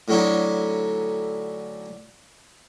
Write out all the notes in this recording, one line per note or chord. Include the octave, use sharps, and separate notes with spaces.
A2 D3 F#3 C#4 D#4 E4